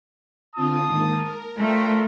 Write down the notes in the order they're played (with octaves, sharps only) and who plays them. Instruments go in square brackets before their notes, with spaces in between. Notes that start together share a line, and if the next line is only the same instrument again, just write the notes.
[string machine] D3 C4 F4 [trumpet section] A5 D#6
[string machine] G#2 D#3 A#3
A#4
[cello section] A3 [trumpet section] D4 F4 A#4 [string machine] C5 G5